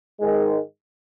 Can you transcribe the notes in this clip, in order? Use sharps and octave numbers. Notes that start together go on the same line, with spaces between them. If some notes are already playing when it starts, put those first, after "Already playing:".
G#2 D#3 G#3